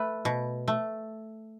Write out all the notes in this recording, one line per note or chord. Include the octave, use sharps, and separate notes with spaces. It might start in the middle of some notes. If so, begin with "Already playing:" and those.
Already playing: A3 B4
B2
A3